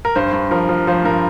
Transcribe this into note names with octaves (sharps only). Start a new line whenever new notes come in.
A#4
G2 C5
G2
F3 A#4
F3
F3 C5
G2 A#4